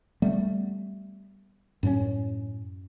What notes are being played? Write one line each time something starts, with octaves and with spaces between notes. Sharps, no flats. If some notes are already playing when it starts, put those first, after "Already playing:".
G3 A3 B3
F#2 A2 B3 C#4